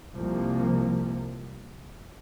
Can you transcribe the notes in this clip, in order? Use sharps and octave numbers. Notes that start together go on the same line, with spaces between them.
C2 C3 F3 A#3